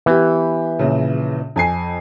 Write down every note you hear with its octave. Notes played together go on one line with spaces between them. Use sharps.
E3 B3 G4
A#1 C#3
F2 G#5 C7